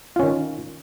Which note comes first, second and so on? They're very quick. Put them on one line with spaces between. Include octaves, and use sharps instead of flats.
F4 C#4 D#3